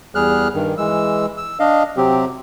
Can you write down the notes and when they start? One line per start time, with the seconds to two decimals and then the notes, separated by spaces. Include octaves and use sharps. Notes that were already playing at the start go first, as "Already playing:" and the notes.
0.15 E2 G3 G#4 F6 F#6
0.54 G2 D#3
0.78 E3 G#3 E6
1.38 E6
1.59 D4 D#5 F5
1.97 C3 F#3 C4 G4